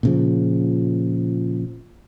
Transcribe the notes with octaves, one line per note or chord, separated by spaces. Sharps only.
A#2 C#3 F3